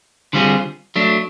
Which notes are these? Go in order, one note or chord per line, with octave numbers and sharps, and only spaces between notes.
D3 G3 C4 F4 G#4
F#3 A3 D4